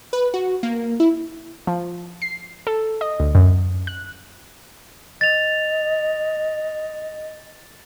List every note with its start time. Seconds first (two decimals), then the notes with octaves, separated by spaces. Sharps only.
0.13 B4
0.34 F#4
0.63 A#3
1.00 E4
1.67 F3
2.22 C7
2.67 A4
3.01 D#5
3.20 D2
3.35 F#2
3.87 F#6
5.21 D#5 A6 F7